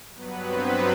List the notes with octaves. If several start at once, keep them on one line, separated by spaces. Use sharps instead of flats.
G2 F#3 B3 B4
C4 C5